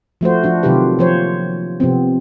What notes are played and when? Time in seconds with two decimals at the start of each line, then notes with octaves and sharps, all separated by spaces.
0.21 F3 A3 F#4 C5
0.44 F3 D4 F#4
0.63 C3 D#3 F#3 F4 G4 B4
0.99 F3 A#3 C5 C#5
1.80 C3 F3 B3 C4